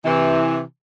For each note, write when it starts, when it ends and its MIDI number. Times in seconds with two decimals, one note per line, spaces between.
0.05 0.61 48
0.05 0.61 52